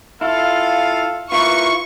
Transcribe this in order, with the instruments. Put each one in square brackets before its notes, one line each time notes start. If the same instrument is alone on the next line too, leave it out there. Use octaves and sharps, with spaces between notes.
[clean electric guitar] E4 [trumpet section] F4 A4 F5
[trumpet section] A#3 A#4 B4 [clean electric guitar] E4 F4 [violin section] C#6